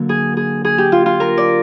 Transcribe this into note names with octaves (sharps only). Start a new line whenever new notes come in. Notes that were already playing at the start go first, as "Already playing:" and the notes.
Already playing: D3 F#3 A#3
G#4
G#4
G#4
G4
F4
F4
A#4
D5